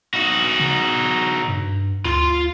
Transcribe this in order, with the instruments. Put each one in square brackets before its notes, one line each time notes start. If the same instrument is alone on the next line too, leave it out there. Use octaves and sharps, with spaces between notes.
[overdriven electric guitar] D#4 F#4
[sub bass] C#3
G2
[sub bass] D2 [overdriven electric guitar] F4 C6